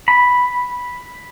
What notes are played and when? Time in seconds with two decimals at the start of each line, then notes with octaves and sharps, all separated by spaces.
0.08 B5